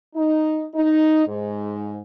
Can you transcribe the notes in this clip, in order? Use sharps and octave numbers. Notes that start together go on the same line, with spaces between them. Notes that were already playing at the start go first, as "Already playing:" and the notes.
D#4
D#4
G#2